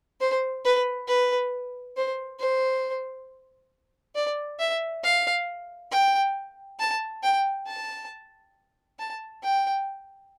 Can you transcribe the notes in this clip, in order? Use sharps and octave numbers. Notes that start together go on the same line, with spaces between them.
C5
B4
B4
C5
C5
D5
E5
F5
G5
A5
G5
A5
A5
G5